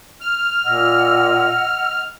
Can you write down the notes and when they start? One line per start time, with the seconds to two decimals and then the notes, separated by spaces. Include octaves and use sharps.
0.21 F6
0.64 A#2 D#5 F#5 E6